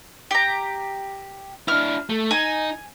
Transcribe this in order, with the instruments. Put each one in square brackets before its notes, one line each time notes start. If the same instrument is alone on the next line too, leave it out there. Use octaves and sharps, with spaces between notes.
[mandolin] G4 A#5
[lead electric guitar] D4 E4 [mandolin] F6
[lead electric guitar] A3
[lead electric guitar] D#4 [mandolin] G#5